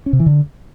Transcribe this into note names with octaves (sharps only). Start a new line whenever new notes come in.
C#4
C3
E3
D3